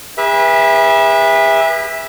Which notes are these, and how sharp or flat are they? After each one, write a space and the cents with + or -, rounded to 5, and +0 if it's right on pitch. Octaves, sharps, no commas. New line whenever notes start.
G#4 -45 B4 -30 E5 +0